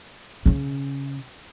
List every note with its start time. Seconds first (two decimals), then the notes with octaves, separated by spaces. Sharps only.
0.46 C#3 C#4